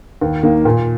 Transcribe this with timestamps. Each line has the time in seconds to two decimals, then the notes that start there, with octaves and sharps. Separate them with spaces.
0.21 D#2
0.43 D#3 A#3
0.65 A#2